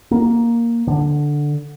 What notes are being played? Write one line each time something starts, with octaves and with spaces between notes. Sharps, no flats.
A#3
D3